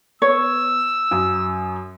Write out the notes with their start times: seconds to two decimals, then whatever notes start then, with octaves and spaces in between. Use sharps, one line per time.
0.22 B3 C#5 E6
1.11 F#2 F#4 D#6